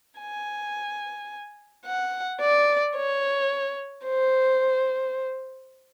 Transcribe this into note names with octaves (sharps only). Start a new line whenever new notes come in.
G#5
F#5
D5
C#5
C5